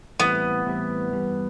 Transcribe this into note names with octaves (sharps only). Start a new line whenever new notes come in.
A2 E3 G3 B3 C4 E4
A2 E3 G3 C4 E4
G2 E3 G3